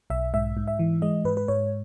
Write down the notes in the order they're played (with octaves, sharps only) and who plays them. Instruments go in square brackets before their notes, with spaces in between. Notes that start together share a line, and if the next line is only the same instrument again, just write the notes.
[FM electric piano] B1 E5
G#2 E5
G#2
E5
E3
G#3 D#5
G#2 B4
B4
G#2 C#5